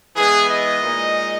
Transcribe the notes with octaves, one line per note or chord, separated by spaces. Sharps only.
E3 G#3 B3 E4 G#4
D#5
A#2 G#3 D#4